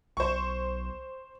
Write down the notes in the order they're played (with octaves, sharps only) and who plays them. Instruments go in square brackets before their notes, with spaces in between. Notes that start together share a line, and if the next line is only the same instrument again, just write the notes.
[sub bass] B1 [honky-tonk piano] C5 C#6